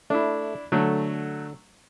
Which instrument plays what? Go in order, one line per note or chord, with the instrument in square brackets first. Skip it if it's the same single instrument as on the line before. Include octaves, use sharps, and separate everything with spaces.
[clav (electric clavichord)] A3 [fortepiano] D4 E4
[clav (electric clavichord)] D3 [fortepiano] F#3 A3